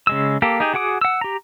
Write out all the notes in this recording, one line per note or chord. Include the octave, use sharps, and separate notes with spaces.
C#3 G#3 E6
A#3 G4 A4
D#4 G4 G#4
F#4 G#4 F#5 D6 D#6
F#5 E6
G4 A#5